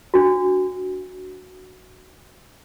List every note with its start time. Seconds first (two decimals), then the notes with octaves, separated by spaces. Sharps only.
0.14 D4 F#4